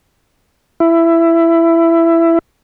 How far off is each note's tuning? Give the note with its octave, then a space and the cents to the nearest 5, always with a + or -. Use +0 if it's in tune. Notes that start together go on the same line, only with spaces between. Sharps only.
E4 +15